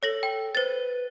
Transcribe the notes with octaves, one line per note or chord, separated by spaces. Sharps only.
A4 C#5 A#6 F#7
G5
B4 C5 A6